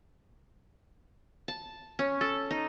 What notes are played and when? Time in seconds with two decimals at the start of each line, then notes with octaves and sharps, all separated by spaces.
1.48 A5
1.99 C#4
2.21 A4
2.51 D#4